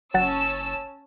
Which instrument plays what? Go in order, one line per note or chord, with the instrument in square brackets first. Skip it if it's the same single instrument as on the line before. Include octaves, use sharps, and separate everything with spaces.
[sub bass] F#1 [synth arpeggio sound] F#3 F#5 A6 [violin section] C#4 A5 E6